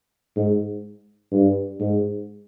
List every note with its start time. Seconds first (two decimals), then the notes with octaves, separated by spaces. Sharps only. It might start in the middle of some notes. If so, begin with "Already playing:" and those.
0.36 G#2
1.32 G2
1.80 G#2